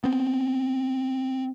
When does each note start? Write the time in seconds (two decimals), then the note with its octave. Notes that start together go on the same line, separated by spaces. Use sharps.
0.04 B3 C4